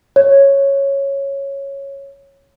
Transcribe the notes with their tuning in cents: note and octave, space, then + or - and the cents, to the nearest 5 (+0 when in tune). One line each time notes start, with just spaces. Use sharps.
C#5 -5